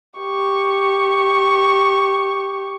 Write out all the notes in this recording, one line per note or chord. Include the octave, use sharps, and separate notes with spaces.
G4 C#6